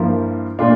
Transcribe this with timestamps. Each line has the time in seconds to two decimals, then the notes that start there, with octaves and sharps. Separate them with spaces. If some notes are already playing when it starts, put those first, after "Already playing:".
Already playing: G2 F3 A#3 E4
0.59 A#2 A3 D4 F4